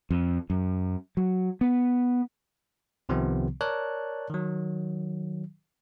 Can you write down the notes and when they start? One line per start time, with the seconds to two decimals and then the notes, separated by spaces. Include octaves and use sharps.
0.11 F2
0.50 F#2
1.17 F#3
1.61 B3
3.09 C2 C3 D#3 F3 B3
3.61 A#4 C#5 D5 A5 F#6
4.30 D#3 F#3